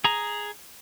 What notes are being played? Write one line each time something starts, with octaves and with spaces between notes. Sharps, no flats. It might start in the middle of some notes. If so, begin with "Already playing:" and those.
G#4 A#5